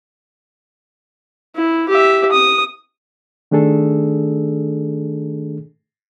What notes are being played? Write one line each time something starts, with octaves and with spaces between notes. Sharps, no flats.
E4
G4 E5
D#6
D#3 A3 D4 G#4 A4